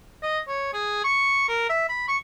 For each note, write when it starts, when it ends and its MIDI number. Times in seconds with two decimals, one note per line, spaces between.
0.23 0.39 75
0.48 0.69 73
0.73 1.04 68
1.04 1.46 85
1.48 1.67 70
1.70 1.86 76
1.89 2.04 83
2.08 2.17 85